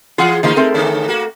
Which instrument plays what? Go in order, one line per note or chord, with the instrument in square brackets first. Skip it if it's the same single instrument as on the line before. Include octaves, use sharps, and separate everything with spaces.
[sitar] E3 G#4 [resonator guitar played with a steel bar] F4 F#5
[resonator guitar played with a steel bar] D#3 F3 A#3 [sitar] G#3 D#4
[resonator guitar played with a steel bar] A3 C4 A#4
[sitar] D3 C#4
A#3 F#4